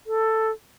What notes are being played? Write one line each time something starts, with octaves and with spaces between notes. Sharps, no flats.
A4